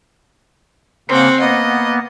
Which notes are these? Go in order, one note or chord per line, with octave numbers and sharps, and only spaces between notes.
C#3 A#3 C4 F#5
A#3 B3 D#5